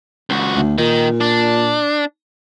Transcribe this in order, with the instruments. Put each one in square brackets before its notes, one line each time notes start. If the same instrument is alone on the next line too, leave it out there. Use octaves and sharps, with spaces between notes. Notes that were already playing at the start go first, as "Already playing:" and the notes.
[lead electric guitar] C#2 F#4
[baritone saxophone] D2
[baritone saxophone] A#2 [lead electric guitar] D#3
[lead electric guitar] D4